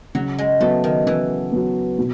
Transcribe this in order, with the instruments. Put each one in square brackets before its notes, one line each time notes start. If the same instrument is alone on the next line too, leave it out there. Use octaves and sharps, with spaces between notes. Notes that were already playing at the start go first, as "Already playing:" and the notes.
[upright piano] C#3 [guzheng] F#3
[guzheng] G#3
[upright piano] F#3 B3 [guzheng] A3
[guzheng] D#3
[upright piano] C#3 [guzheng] E3
[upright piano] F#3 B3
B2